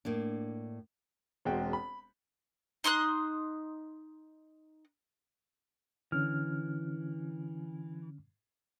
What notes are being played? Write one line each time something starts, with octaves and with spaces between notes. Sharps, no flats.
A2 A#3 D4
E1 G#3 C4 F#4 G5
B5
D#4 C6 D#6 F#6
D3 E3 C#4 F6